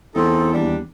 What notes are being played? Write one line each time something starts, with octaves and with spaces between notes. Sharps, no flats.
E2 C4 D#4 A4
D#2 G3 D4